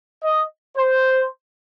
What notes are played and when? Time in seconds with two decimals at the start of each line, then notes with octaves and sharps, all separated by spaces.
0.24 D#5
0.77 C5